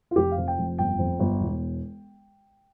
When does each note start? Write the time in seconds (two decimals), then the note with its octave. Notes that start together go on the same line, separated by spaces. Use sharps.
0.11 F4
0.16 F1 G4
0.32 F5
0.37 F2
0.47 G5
0.58 F1
0.78 G1 G5
0.99 F2
1.20 G1
1.40 E1